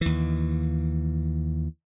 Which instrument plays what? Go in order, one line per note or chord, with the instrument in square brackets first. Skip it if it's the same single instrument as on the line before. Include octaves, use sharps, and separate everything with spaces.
[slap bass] D#2 E3